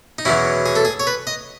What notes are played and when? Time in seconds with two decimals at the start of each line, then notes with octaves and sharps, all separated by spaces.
0.18 D#4
0.25 E2 B2 F#3 C#4 E4
0.66 G#4
0.75 A4
0.85 G#4
1.00 C#5
1.07 B4
1.27 D#5